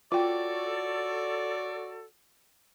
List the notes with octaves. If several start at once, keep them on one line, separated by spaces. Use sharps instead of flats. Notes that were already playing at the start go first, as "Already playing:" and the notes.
F4 F#4 A4 C#5 D5 G5